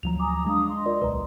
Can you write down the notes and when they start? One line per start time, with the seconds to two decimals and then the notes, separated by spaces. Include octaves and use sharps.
0.03 D2 F3 F#3 A#5 F7
0.20 G#5 A#5 D6 D#6
0.46 G#3 D4 F5 D#6
0.68 D#5 C6
0.86 F4 A#4 D5
1.02 D1 B1 B4 A#5